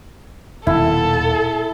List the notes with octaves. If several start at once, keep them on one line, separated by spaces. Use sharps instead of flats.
D#1 B2 D#3 E4 A4